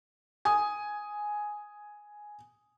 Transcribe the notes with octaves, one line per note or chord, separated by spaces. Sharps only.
G#5 D#6